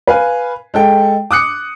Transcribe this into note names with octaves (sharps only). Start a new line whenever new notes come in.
B4 F5 G#5
G#3 A4 G5
D6 D#6 F#6 C#7